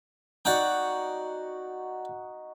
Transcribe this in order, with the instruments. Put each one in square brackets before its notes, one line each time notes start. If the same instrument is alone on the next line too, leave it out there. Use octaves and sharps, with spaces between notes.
[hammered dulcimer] D#4 F#4 [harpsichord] D5 F#5 G5